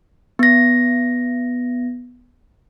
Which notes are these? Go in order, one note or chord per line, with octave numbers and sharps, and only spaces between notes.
B3 A#6